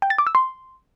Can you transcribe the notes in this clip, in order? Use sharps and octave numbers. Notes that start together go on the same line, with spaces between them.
G5
A6
D6
E6
C6